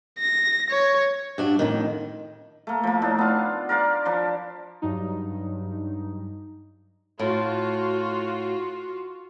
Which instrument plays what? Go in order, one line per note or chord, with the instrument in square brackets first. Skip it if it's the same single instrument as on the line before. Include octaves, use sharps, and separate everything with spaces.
[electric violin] A#6
C#5
[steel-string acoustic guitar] G2 D4 F#4
F2 A2 D#3
[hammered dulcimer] A3 A#3
F3 A#3
A2 D4 D#4
B3 F4
A#4 B4 D5 F5
F3 D4
[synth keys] G2 F#3 D#4
[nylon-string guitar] A2 [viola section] F4 F#4